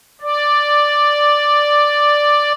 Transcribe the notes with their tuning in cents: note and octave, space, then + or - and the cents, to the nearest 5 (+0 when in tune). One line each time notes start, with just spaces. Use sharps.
D5 +0